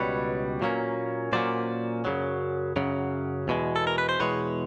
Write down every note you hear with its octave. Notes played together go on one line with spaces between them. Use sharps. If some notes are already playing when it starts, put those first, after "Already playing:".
Already playing: C#2 B2 G3 B4 C#5
A#2 F#3 A#3 C#4
A#2 F#3 A#3 C#4 C5 D5
F#2 C#3 F#3
F#2 C#3 F#3
E2 B2 G#3
A4
A#4
B4
C5
E2 B2 G#3 B4 C#5